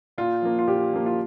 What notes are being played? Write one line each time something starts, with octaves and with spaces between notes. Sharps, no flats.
A#2 F4
F3 A#3
F4
A#2 G4
F3 A#3
F4